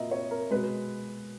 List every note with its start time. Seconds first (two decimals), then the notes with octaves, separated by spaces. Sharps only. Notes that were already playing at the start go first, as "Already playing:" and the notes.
Already playing: A#2 A#3 D#5 E5
0.11 C#5
0.31 A#4
0.51 B2 G#3 B4